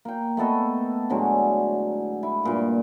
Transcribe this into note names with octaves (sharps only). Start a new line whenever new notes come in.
A#3 G5
A3 B3 A4 D#5
A2 D3 F#3 G#3
E4
G2 A#2 D6